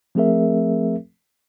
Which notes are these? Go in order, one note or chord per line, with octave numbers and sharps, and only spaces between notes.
F3 A3 C4 G#4 A#4 E5